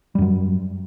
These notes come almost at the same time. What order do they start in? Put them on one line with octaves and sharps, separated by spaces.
G3 F#2 F#3